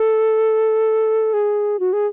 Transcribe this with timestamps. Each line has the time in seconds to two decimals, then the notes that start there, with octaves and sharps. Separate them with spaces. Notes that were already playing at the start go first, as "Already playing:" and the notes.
Already playing: A4
1.33 G#4
1.79 F#4
1.93 G#4